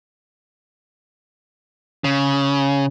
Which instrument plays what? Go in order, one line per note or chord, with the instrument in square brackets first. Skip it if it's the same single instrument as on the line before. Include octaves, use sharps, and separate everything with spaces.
[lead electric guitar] C#3